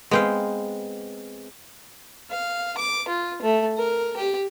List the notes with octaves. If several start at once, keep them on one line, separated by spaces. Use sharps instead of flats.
G#3 B3 C4 F5 G5
F5
D6
F4
A3
A#4
G4